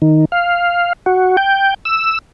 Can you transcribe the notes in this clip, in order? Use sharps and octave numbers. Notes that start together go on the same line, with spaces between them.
D#3
F5
F#4
G5
E6